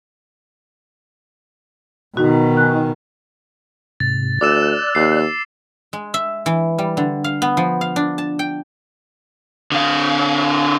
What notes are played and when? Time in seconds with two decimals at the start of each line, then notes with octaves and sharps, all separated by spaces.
2.17 B2 D#3 D#4 F#4
2.57 G#5 F#6
4.00 G#2 C3 A6
4.41 D2 D5 D6 E6 F#6 E7
4.95 D#2 C7
5.93 G#3
6.14 E5
6.46 E3
6.78 G3
6.97 D3
7.24 F5
7.42 B3
7.57 F3
7.81 F5
7.96 D4
8.18 A5
8.39 G5
9.72 D3 F5